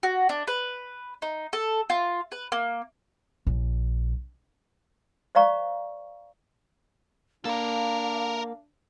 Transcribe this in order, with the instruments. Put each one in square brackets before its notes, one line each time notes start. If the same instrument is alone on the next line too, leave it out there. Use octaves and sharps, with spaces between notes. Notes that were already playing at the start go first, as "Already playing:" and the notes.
[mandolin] F#4
D4
B4
D#4
A4
F4
B4
A#3
[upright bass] A#1
[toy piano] C5 D5 F5 A#5 C#6
[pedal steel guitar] A#3 [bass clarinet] D4 [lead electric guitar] A4 A#4 [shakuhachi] F5